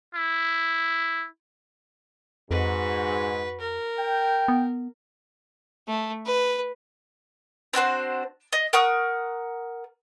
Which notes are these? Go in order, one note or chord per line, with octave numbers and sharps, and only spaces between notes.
E4
F2 G#2 F#4 B4
A#4
G5
B3
A3
B4
C4 D4 F#4 C5
D#5
A#4 F#5 C#6 D#6